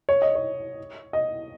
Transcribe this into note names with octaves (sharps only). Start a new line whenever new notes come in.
C#5
D#5
C#5
D#5